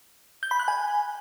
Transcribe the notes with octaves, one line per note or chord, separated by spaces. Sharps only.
G6
B5
F#6
G#5